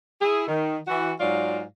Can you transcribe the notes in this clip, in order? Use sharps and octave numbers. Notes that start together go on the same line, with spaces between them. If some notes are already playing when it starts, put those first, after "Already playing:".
E4 G#4
D#3
E3 F#4
G#2 F#3 F4 D5 F5